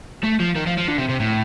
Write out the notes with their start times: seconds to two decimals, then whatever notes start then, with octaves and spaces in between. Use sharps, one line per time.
0.24 A3
0.40 F3
0.56 D#3
0.67 F3
0.78 F3
0.88 D3
0.98 C3
1.09 C3
1.20 A2